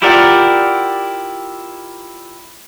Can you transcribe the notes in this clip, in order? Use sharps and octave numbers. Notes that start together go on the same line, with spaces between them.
E4 F4 G4 A#4 D5 F#5